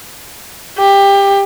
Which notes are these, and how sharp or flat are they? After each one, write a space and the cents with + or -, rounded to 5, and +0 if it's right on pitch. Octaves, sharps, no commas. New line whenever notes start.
G4 +20